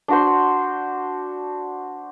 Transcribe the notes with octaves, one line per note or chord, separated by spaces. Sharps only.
D4 F#4 C5